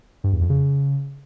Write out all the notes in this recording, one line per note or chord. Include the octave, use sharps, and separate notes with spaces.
G2
E2
F2
C#3